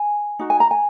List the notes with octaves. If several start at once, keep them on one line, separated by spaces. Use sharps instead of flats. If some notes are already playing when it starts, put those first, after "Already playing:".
Already playing: G#5
D#4 F#4
G#5
A#5
G#5